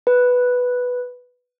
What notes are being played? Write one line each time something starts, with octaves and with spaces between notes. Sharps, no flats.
B4